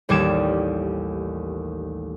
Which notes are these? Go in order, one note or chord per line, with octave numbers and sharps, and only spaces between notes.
A1 D#2 G3 D6 G#6 E7